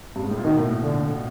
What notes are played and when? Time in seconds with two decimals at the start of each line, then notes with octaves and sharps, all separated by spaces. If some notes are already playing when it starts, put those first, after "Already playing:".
0.16 G2
0.22 G#2
0.30 A2
0.37 A#2
0.44 B2 D#3
0.57 A2
0.70 A2
0.82 A#2 D3